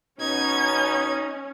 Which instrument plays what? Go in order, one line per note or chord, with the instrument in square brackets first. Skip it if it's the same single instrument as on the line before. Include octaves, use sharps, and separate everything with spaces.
[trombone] B2 [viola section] C#4 [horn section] D#4 [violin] G#6